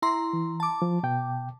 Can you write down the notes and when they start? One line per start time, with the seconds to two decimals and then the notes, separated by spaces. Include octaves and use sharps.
0.02 E4 A#5 C6
0.33 E3
0.60 A5 D6
0.82 F3
1.03 B2 G5